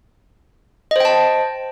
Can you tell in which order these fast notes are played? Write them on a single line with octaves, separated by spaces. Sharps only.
D#5 C5 G5 A5